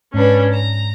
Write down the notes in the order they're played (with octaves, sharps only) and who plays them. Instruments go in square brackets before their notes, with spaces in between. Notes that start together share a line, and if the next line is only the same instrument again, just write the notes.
[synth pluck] G#2 [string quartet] C#4 D4 B4
[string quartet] A#5